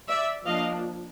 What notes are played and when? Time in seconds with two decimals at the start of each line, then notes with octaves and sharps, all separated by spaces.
0.09 D5 E5
0.46 F3 A#3 D4 D#5 F5